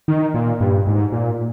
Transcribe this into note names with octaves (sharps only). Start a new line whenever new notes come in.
D#3
A#2
G2
G#2
A#2